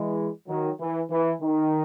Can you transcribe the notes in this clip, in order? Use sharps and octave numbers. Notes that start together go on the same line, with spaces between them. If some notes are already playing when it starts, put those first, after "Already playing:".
Already playing: E3 G#3
D#3 F#3
E3
E3
D#3